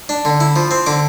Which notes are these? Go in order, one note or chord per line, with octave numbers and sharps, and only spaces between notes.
D4
D3
E4
F3
C4
D3 D6